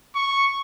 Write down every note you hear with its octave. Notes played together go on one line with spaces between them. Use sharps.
C#6